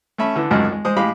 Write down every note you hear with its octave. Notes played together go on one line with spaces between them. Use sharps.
A3 C#4 E5 B5
D3 E3
G#1 C#2 F#2 G#3 A3
G#3
G#3 C5 D#6
A2 G#3 G4 F5 B5